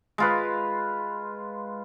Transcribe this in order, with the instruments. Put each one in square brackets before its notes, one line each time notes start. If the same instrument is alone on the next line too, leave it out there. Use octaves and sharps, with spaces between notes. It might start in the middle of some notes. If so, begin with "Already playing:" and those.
[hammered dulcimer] G#3 F4 B4